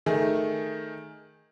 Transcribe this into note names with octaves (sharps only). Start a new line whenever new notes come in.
D#3 A3 G#4